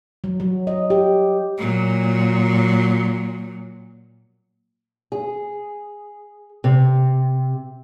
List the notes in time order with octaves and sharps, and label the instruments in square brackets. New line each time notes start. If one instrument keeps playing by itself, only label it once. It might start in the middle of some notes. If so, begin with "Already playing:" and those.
[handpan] F#3
F#3
D#5
G4
[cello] A#2 F#3
[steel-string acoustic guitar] G#4
C3